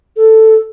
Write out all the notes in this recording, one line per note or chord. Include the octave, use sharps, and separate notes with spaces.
A4